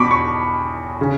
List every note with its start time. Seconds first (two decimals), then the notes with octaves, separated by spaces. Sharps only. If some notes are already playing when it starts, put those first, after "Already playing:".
Already playing: E2 B2 B5 C#6 D6
0.11 C#6
1.01 C#3